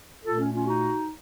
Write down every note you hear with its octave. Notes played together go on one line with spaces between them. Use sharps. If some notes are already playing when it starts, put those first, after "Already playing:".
A#2 A3 F4 A4
C#4
C#4 F4
D#4 F#4